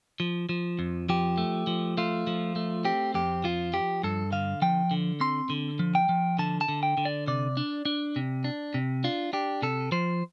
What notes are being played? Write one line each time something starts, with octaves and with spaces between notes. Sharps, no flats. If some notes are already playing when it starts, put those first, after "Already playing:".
F3
F3
F2
F3 G4
A3
F3
A3 F4
F3
A3
C4 G4
F2 G4
F3 F4
F3 G4
G2 A4
D3 F5
F3 G5
D3
C4 C6
D3
F3
G5
F3
D3 A5
A5
D3
G5
D3
D5
C3 D5
D4
D4
C3
D4
C3
D4 F4
D4 G4
C3 A4
F3 C5